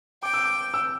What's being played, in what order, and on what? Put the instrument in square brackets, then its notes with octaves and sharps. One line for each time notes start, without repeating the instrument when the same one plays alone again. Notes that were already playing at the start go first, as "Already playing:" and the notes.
[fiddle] G5 [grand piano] D6
[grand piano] E6
D6
E6